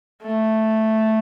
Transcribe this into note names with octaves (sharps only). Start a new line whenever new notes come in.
A3